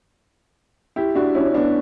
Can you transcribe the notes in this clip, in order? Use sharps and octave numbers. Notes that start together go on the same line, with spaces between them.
E4 G4
D4 F#4
C#4 E4
C#4
B3 D4